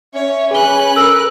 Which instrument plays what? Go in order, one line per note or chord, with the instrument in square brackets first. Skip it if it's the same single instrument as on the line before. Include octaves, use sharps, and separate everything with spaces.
[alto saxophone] C#4 [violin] C#5 [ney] E5
[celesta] G#4 G7 [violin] B4 F#6 [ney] G#5
[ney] A4 [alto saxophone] A#4 [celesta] E6